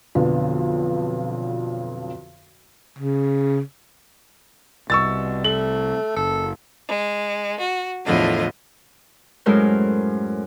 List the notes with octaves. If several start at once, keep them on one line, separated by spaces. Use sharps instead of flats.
B1 F2 D3 F3 B3
C#3
C2 B2 C#6 E6 A6
A3 F#7
F#1 A4
G#3
F#4
E2 A2 D3 F3 D#5
F#2 A2 G#3 E4 A#4 C5